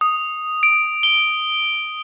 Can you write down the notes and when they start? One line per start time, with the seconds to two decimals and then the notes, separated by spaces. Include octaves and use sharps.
0.01 D#6
0.63 D7
1.03 G7